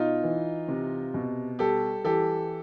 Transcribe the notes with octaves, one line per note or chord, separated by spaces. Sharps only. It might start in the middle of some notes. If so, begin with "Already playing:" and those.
Already playing: B2 D#4 F4
E3
C3
B2
G3 G4 A4
E3 G4 A4